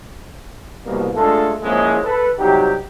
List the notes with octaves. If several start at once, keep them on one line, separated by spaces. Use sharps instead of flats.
C2 B2 A#3
G#3 A3 D4 F4 A4
F3 G#3 A#3 C4 C#4 E4
A4 B4
C3 F#3 G3 D#4 G4